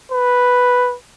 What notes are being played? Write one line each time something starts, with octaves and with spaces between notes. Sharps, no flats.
B4